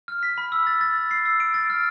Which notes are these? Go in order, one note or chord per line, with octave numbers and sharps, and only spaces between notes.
F6
B6
B5
E6
A6
A6
A6
C7
E6
D7
A6
F6